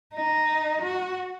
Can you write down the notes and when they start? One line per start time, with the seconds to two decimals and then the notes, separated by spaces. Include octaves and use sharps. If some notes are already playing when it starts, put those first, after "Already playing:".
0.14 D#4
0.82 F#4